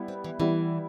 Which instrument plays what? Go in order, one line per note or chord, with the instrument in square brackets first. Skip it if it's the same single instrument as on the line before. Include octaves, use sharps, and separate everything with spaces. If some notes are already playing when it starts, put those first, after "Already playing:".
Already playing: [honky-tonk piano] G3 B3 E4
[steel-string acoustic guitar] C4
E3
[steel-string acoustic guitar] E3 [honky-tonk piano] G3 B3 E4